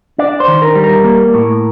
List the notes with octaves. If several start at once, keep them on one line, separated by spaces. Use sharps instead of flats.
D4 D5
C5
D#3
A#4
G3
A#4
A#3
A2